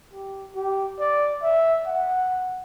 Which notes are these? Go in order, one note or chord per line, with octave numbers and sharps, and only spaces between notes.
G4
G4
D5
E5
F#5